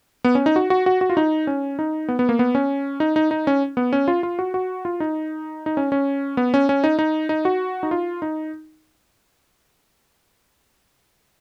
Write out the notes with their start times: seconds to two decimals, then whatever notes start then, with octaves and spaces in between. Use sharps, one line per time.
0.24 B3
0.35 C#4
0.46 D#4
0.56 F#4
0.70 F#4
0.86 F#4
1.01 F#4
1.10 F4
1.17 D#4
1.47 C#4
1.79 D#4
2.08 B3
2.19 B3
2.29 A#3
2.39 B3
2.55 C#4
3.00 D#4
3.16 D#4
3.31 D#4
3.47 C#4
3.77 B3
3.93 C#4
4.08 F4
4.23 F4
4.39 F#4
4.54 F#4
4.85 F4
5.00 D#4
5.66 D#4
5.77 C#4
5.92 C#4
6.37 B3
6.54 C#4
6.69 C#4
6.84 D#4
6.99 D#4
7.29 D#4
7.45 F#4
7.83 D#4
7.91 F4
8.22 D#4